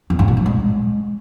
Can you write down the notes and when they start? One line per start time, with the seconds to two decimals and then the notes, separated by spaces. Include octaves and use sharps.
0.10 E2
0.19 G#2
0.28 A#2
0.37 F#3
0.46 G#3